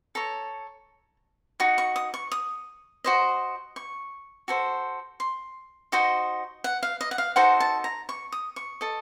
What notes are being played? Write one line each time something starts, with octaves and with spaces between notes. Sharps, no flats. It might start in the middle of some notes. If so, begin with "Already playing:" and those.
A4 C#5 A#5
D#4 F#4
C#6
D#6
C#6
D#6
F#4 C5 D#5
C#6
F#4 A4 C5
C6
D#4 F#4 C5 D#5
F#5
F5
D#5
F#5
F5
D#4 F#4 A4 C5 F#5
A5
A#5
C#6
D#6
C#6
A4 D#5